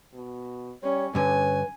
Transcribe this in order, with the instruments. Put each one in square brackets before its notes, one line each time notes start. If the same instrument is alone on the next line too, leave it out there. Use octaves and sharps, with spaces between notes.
[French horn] B2
[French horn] G3 [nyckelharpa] C#4 [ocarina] C#5
[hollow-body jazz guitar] G2 D3 [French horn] C#4 [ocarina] B4 [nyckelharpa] G#5